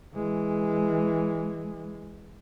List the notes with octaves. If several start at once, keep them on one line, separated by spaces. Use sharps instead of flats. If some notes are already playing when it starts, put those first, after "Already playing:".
E3 G#3